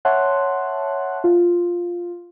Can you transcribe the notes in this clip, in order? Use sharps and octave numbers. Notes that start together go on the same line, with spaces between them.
C#5 E5 F#5 A5 C6 F#6
F4